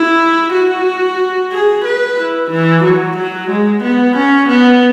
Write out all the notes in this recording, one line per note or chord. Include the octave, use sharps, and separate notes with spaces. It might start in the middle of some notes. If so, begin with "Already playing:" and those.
Already playing: E4
F#4
G#4
B4
E4
E3
F#3
F#3
G#3
B3
C#4
B3